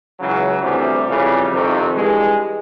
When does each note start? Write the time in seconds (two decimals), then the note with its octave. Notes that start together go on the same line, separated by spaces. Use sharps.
0.19 C#2 C#3 E3 F#3
0.63 D2 C3 E3 G3
1.07 F2 C#3 E3
1.52 F2 C3 D#3
1.95 G2 E3 G#3